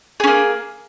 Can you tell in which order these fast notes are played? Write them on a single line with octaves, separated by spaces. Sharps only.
G#4 C#4 A#3